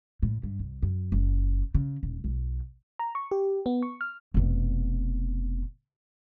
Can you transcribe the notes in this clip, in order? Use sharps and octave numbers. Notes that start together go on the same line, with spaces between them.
A2
G2
C2
F#2
F#1
C#3
D#1
B1
A#5
C#6
G4
B3
C#6
F6
F1 B2